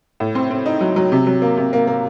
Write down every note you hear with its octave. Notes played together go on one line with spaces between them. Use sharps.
A2
C4
C4
D#4
F#3
F#3
C3
F#3
A#3
C3
A#3
A#3